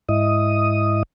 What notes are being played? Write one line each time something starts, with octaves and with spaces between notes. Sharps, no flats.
G#2 E4 D#5 D#6